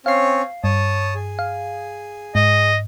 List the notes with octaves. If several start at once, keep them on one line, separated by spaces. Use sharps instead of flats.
C4 C#4 C#5 F5 C7
G2 C#5 A5 D#6
G#4
F5
G#2 D#5